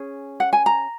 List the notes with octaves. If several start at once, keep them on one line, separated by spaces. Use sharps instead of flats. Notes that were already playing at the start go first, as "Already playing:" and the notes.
Already playing: C#4 G#4
F#5
G#5
A#5